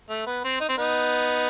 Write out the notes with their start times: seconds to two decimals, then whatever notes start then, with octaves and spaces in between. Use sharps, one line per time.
0.10 A3
0.26 B3
0.44 C4
0.60 D#4
0.69 C4
0.78 B3 D#4